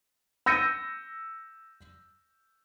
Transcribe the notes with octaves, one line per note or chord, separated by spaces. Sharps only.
E6 G6 A#6 C#7 D#7